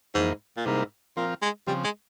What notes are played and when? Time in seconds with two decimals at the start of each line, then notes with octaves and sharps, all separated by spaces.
0.15 F2 G#2 E3 A#3
0.57 A#2
0.66 G#2 C3 G3 A#3 E4 A#4
1.17 A#2 F3 C4 F4 A#4
1.42 G#3
1.67 C#3 F3 G3 C4
1.84 G#3